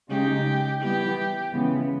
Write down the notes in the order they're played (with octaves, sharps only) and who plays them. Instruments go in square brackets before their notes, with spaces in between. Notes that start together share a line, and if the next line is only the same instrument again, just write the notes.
[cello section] C#3 G#3 D#4 [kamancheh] G4
[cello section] E3 G3 B3 [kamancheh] G4
[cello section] C#3 E3 G#3 B3